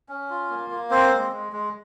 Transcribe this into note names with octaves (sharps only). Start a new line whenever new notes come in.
C#4
F4
A#3
A#3
C4 C5
G#3
G#3
G#3